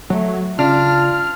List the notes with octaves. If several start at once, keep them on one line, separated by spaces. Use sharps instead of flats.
F#3 A3
C#3 D4 F4 F6